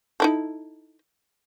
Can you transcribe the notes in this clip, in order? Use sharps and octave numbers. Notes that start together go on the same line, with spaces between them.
D#4 E4 A4